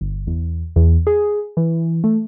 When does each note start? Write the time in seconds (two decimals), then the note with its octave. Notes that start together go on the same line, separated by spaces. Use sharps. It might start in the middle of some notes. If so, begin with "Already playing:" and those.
0.01 G1
0.27 E2
0.76 E2
1.07 G#4
1.57 E3
2.04 A3